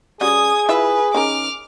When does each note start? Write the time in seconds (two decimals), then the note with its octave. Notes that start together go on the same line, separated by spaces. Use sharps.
0.21 G3 C#4 F#4 G#4 D#6 G#6
0.69 E4 F4 B4 E5
1.14 D#3 C#4 A#4 D6 F6